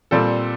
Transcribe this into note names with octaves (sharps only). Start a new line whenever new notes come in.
A#2 G3 C4 A4